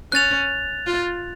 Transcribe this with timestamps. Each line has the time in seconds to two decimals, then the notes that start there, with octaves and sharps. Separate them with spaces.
0.12 C#4 F#6 A6 F7
0.87 F4